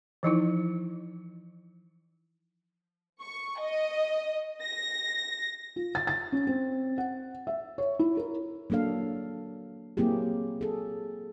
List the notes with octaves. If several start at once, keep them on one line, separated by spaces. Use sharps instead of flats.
E3 F3 D#4 E4
C#6
D#5
A#6
F4
A6
A6
C#4
C4
F#5
E5
C#5
E4
A#4
F#3 A#3 D4 A4 F5
F#3 A#3 C4 E4 G4 G#4
G#4 A4